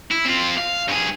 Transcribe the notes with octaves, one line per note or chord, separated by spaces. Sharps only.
E4
C4 F4
F5
G2 G#4